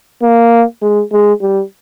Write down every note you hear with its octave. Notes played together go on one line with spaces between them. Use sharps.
A#3
G#3
G#3
G3